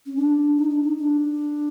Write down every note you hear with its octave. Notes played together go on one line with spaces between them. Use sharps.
C#4
D4
D#4
D4
D#4
D4